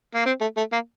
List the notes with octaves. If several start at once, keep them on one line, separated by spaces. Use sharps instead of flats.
A#3
C4
A3
A3
A#3